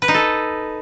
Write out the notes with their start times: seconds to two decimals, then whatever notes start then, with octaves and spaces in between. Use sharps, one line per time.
0.02 B4
0.08 D#4
0.14 A4